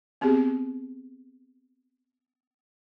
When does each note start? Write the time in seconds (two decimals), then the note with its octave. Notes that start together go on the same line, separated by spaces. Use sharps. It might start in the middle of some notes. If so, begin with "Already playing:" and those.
0.21 B3 C4 G4 G#4